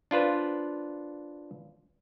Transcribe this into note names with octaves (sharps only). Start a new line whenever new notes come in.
D4 F4 B4 C5